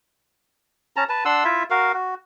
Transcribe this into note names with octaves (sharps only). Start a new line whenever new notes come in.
C#4 A5 A#5
B4 A5
D4 F#5 C6 E6
E4 F4 E5
F#4 A#4 F5
F#4